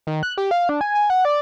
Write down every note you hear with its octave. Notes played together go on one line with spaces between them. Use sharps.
D#3
F#6
G4
F5
D4
G#5
G#5
F#5
D5